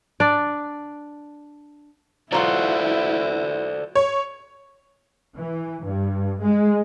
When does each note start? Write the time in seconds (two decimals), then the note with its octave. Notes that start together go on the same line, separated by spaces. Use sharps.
0.20 D4 D5
2.32 F#3 E4 F4 A4 C5 D5 F#5
3.95 C#5
5.35 E3
5.84 G2
6.42 G#3